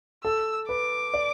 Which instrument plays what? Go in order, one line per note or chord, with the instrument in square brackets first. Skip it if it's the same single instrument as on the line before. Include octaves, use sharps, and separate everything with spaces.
[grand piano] A4 [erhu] E6
[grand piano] B4 [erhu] D6
[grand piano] D5